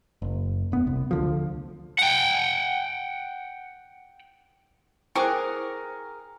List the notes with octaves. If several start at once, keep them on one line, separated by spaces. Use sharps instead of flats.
F#1
E1 B3
C2
D2 D3 F3
F#5 G5
E4 G#4 A#4 C5 G5 D6 F#6